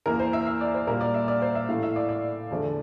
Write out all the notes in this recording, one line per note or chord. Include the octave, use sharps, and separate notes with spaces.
E2 E3 A#3 A#4
C5
E5
E5
D5
C5
A#2 G3 A#3 A#4
D5
E5
D5
C5
E5
A2 E3 A3 F5
E5
D5
D5
E2 D3 F3 A3